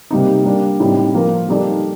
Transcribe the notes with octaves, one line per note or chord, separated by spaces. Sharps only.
C3 G3 A#3 D#4
G3 A#3 D4
A2 G3 C4 D#4
F3 A#3 F4 A#4
G3 A#3 D#4 A4 D5